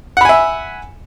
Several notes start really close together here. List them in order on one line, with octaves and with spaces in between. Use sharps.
F#5 B5 G#5 E5